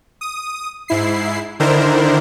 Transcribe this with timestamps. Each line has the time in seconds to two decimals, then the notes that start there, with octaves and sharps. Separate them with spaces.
0.21 D#6
0.88 G#2 E4 C7
1.60 D3 D#3 D4 E4 A#4 C5